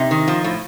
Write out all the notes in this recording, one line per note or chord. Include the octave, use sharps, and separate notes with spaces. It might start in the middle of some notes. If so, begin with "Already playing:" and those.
Already playing: C3 D#4
D#3
F3
A2